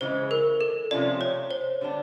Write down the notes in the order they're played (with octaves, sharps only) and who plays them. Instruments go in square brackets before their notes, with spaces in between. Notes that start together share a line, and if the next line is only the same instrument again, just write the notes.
[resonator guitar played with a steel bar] C#3 E3 G#3 [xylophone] C5
[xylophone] A#4
A4
[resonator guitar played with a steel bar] C3 F3 A3 C#4 F4 [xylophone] D5
[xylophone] C#5
C5
[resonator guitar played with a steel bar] D3 G3 B3 D4